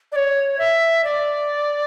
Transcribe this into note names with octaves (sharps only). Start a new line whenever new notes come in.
D5
C#5
E5
D5